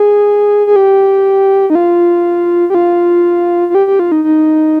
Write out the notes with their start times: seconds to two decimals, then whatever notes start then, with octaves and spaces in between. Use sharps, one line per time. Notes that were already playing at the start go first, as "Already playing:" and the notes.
Already playing: G#4
0.67 G#4
0.76 G4
1.70 D#4
1.75 F4
2.70 G4
2.75 F4
3.70 F4
3.75 G4
3.87 G4
3.99 F4
4.12 D#4
4.24 D#4